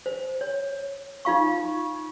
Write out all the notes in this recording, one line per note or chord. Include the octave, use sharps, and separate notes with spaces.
C5
C#5
D#4 F4 F5 C#6